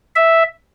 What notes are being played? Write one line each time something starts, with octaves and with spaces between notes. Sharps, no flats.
E5